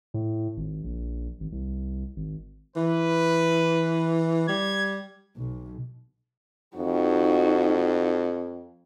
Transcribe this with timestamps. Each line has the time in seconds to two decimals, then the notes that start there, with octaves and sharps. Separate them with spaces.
0.14 A2
0.57 G#1
0.84 A#1
1.40 G#1
1.52 C2
2.16 G#1
2.76 E3 B4
4.48 G3 G#6
5.37 B1
6.77 F2 D#4 F#4